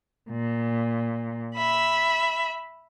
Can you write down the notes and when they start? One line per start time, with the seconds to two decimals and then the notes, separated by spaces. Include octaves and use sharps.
0.30 A#2
1.54 E5 B5